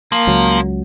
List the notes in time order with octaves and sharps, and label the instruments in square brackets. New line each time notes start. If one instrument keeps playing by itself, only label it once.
[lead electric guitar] F3 [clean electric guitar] A#3
[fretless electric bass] C#2 F#3